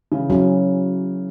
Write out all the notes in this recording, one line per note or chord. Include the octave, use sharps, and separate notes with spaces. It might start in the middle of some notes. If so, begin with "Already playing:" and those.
C#3 E3
F#3 C#4